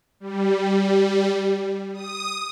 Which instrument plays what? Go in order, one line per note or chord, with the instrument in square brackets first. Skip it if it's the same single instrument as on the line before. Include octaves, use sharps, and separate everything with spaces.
[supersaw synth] G3
D#6